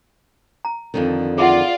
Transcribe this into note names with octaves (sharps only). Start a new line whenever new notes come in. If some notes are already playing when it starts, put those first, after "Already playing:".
A#5
F2 D3 D#3
F4 G#4 D5 E5 F#5